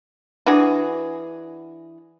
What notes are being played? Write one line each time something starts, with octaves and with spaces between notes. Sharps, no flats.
E3 D4 F#4 G#4